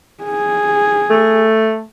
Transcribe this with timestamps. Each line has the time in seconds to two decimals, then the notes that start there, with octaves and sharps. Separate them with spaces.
0.24 G#4
1.10 A3